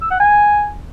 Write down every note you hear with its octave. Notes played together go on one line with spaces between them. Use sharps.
E6
F#5
G#5